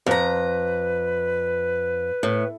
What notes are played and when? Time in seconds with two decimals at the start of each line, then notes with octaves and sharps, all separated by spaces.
0.06 F2 B4 A#5
2.23 A2